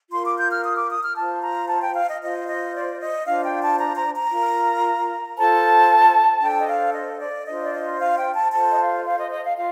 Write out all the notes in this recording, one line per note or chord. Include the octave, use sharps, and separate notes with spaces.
F4 A#4 C6
D6
G6
F6
D#6
D6
D#6
F6
F4 C5 A5
A#5
A5
G5
F5
D#5
F4 C5 D#5
D#5
D5
D#5
D4 F4 C5 F5
G5
A5
A#5
A#5
A#5
F4 A#4
F4 A4 C5 A5
D4 A4 C5 G5
D#5
F5
D#5
D5
D4 F4 C5 D#5
D5
D#5
F5
G5
A5
F4 A4 C5 A5
D#5
F5
F5
D#5
D#5
F5
F4 F5